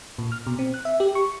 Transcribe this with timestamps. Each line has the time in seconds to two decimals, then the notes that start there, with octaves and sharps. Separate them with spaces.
0.18 A#2
0.32 F6
0.47 B2
0.59 C4
0.74 F#6
0.85 E5
1.00 G4
1.15 C#6